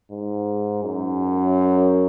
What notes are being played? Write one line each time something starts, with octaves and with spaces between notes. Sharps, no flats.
G#2
F#2